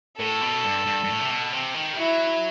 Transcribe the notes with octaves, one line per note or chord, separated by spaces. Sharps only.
A2 A4
B2
G2
G2
G2
A2
C3
B2
C3
D#3
G3
F#3 E4